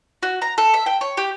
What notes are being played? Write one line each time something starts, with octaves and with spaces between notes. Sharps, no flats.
F#4
A#5
A4
E5
G5
C#5
G4